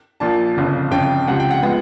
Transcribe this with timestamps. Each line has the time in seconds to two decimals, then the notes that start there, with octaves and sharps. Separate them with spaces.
0.20 A#1 A#2 F3 A5
0.57 G1 F2 C#3
0.91 G1 F2 C#3 F3 G5
1.27 C#2 C3 F3 F#5
1.40 G5
1.50 F#5
1.63 F3 G#3 B3 F#5